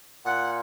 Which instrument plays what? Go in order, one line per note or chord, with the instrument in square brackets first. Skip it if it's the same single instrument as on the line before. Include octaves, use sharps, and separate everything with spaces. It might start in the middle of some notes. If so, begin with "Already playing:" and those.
[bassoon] A#2 [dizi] F#5